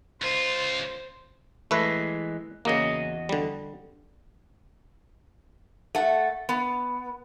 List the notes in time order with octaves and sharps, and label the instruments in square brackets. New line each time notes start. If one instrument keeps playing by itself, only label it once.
[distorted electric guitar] C#2 F4 [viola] C5
[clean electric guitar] E3 G#3 [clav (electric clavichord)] A3 B4
[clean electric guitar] E2 F#4 D#5 [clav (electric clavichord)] C#3 A#3
[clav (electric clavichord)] D3 G3
[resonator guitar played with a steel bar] A3 F#5
B3